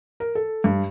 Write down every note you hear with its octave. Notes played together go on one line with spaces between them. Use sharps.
A#4
A4
G2